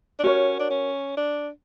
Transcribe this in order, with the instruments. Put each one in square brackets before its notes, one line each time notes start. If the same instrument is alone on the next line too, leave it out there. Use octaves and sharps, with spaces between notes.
[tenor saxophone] D4
[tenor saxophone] C#4 [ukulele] F#4 A#4 C#5
[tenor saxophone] D4
C#4
D4